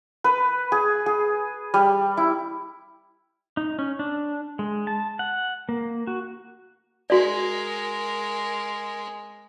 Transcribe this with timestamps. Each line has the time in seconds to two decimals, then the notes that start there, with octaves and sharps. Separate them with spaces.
0.24 B4
0.72 G#4
1.06 G#4
1.74 G3
2.17 E4
3.57 D#4
3.79 C#4
3.99 D4
4.59 G#3
4.87 A5
5.19 F#5
5.69 A#3
6.07 F#4
7.10 G#3 F#4 A#4 D5